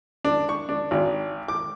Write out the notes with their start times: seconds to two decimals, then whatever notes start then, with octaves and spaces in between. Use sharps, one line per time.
0.25 D4
0.49 C#6
0.69 D4
0.91 G#1
1.48 D6